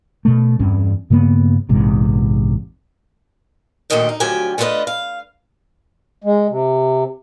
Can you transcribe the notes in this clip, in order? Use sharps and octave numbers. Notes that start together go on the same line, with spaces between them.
B2 A3
E2 G2 C4 C#4
G2 C#3 A#3 B3
A#1 E2 G#2 C3
D2 A#2 D#3 A4 D#5 G5
D#4
D2 F3 F#3 G4 G5 G#5
A3 D4 F4 G#4 B4 D#5
F5
G#3
C3